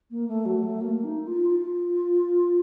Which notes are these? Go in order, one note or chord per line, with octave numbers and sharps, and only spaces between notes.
A#3
A3
F#3
A3
A#3
D#4
F4
F4